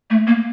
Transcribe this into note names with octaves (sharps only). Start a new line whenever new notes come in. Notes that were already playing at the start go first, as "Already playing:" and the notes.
A3
A#3